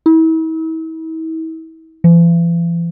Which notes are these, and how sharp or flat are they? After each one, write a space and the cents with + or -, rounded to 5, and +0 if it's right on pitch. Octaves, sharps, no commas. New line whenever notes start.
E4 -40
E3 +45